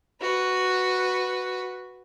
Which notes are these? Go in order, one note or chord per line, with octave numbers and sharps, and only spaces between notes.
F#4 B4